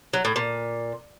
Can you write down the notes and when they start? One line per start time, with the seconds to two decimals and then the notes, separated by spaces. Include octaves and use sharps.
0.13 F#3
0.25 A2
0.36 A#2